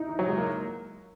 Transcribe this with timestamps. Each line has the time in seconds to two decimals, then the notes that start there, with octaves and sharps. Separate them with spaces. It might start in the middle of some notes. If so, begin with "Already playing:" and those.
Already playing: D#4 E4
0.09 E3
0.19 F#3
0.28 G#3
0.38 A#3